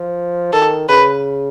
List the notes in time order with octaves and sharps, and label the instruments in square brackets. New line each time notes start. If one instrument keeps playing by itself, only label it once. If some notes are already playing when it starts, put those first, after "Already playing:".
Already playing: [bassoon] F3
[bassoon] D#3 [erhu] A4
[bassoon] C#3 [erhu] B4